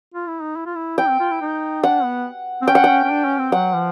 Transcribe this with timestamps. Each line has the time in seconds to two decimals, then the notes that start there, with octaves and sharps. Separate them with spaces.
0.14 F4
0.27 E4
0.42 D#4
0.56 E4
0.66 F4
0.76 E4
0.98 E4 G5
1.09 C4
1.19 F4
1.31 E4
1.41 D#4
1.83 D4 F#5
2.04 B3
2.62 C4
2.67 C#4 G5
2.75 F#5
2.84 D4 G5
2.88 C#4
3.04 C#4
3.10 D4
3.24 C#4
3.38 C4
3.52 F#3 F#5
3.74 F3